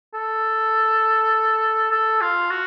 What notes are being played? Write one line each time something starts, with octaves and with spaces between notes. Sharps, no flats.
A4
A4
F4
F#4